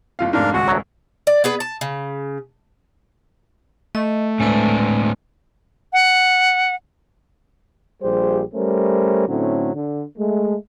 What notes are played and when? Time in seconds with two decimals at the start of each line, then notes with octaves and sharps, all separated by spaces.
0.19 F#1 F4 F5
0.33 F1 G#2 D4 A#4 F5
0.54 D#1 C#2 G#3 F#4 F#5
0.68 D2 F#3
1.27 D5
1.44 B3 G#4 B4
1.60 A5
1.81 C#3
3.95 A3 D#5
4.40 A2 G#3 C4 D4 B4
5.93 F#5
8.02 A#1 G3 G4 G#4 C5
8.54 G3 A3 C#4 A#4 C5
9.28 A2 D3 F#3 C4 C#4
9.75 D3
10.18 G#3 A3